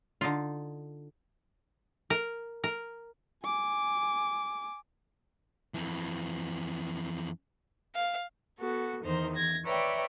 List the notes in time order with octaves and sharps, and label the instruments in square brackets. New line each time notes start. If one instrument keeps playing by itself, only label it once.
[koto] D3 D#4 F4
A#4
A#4
[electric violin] G#5 D6
[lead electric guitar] F2 E3
[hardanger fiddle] F5
[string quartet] B3 F#4 A4
E2 D#3 D#4 C5 A#5
E2 G#6 A#6
B4 C#5 D5 E5 G5 A#5